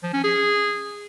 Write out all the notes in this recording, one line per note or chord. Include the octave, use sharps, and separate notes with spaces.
F3
C#4
G#4